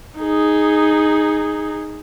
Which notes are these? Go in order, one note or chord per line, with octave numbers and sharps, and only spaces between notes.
D#4 G#4